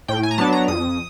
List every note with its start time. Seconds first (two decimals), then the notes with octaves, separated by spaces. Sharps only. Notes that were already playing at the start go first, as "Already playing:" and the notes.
0.08 A2 G5
0.23 G#5
0.31 A#5
0.38 F#3 B3 D4 A5
0.53 A#5
0.68 F2 D#6